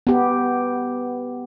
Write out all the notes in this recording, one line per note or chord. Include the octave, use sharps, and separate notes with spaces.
B3 G4